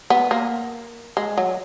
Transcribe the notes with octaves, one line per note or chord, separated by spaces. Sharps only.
B3
A#3
G#3
F#3